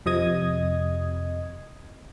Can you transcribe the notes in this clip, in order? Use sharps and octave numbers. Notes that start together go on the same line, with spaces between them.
F2 C3 D#5 D#6 G#6